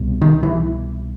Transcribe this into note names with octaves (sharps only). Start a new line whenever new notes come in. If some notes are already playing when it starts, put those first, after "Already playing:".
Already playing: C2 B2
D#3
E3